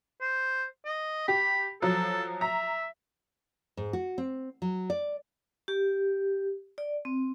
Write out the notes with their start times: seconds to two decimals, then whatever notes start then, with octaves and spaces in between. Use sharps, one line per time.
0.21 C5
0.86 D#5
1.28 G4 B5
1.82 F3 F#3 A4
2.41 E5 A#5
3.77 G#2
3.93 F#4
4.18 C4
4.62 F#3
4.90 D5
5.68 G4
6.78 D5
7.05 C4